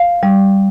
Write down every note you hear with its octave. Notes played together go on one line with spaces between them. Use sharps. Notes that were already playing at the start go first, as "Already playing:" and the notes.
Already playing: F5
G3